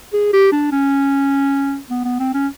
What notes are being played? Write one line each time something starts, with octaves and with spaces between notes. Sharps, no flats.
G#4
G4
D4
C#4
B3
B3
C4
C#4